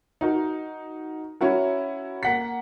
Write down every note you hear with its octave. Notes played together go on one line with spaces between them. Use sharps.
D#4 F#4 A#4
C#4 E4 F#4 A#4
A#3 F#5 B6